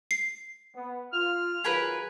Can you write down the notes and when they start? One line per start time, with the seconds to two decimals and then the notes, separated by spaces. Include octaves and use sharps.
0.11 C7
0.75 B3
1.13 F4 F6
1.64 D#3 F#3 F4 G#4 A#4 B4